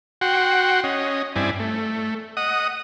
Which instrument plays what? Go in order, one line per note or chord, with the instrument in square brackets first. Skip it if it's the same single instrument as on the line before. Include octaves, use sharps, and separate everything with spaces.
[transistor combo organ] F#4 F#5 G5 C6
C#4 D#5
G2 C4 E4 D5 G#5
A3
D#5 F#5 D#6